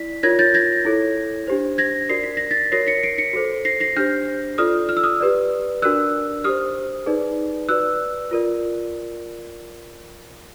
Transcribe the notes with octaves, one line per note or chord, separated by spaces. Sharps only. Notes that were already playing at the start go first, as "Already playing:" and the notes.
Already playing: E4 D5 B6
F4 A#4 C#5 G#6 A#6
G6 A6
G#6 A#6
E4 A4 C#5
D4 G4 C5
G#6 A#6
F#4 A#4 D5 C7
B6
A#6
A6 B6
F#4 A#4 C#5 A#6 C7
B6 C#7
C7 D7
B6 C#7
F#4 A4 C5
A#6 C7
A#6 C7
D4 G4 C5 F6 G6
F4 A4 D5 D#6 F6
F6
E6
D#6 F6
G4 B4 D5
D4 F#4 A#4 D5 E6 F#6
G4 C5 D#6 F6
D#4 G#4 B4 D5
F#4 B4 D5 E6 F#6
F4 A#4 D5